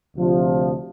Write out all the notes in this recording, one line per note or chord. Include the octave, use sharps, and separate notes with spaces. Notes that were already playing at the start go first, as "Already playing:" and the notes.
D2 C3 F3